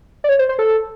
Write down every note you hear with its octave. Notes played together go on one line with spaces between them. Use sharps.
D5
C#5
C5
C5
A4